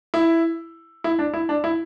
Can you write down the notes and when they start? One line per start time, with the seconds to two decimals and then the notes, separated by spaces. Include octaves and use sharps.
0.14 E4
1.04 E4
1.19 D4
1.34 E4
1.49 D4
1.64 E4